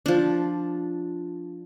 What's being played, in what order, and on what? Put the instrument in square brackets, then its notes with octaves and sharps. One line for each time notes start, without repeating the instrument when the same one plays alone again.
[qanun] F3 D4